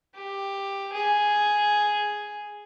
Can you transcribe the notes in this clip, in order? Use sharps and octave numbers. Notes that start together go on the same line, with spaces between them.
G4
G#4